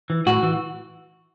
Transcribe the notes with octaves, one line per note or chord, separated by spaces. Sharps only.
E3
A2 F#4
E3